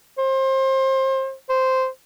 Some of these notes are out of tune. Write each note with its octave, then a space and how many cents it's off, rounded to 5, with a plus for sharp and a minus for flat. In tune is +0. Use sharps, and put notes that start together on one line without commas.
C5 +30
C5 -5